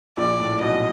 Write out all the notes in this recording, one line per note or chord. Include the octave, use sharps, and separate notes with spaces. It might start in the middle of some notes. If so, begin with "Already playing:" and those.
A#1 A#2 D5
A2
B1 B2 D#5